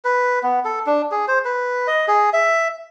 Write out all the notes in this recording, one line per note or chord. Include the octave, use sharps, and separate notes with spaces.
B4
B3
A4
D4
G#4
C5
B4
D#5
G#4
E5